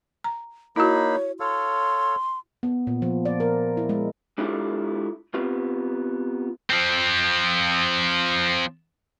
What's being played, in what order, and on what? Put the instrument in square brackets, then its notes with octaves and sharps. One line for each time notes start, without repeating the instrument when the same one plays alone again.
[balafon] A#5
[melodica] A#3 D#4 B5 [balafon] E4 F#4 [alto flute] C#5
[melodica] A4 C#5 F5 [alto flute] C6
[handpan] B3
A#2
F3
D5
A#4
E4
G#3
[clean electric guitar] G#3 D4 E4 F4 G4 A4
B3 C4 F4 G4
[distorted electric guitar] F3 C4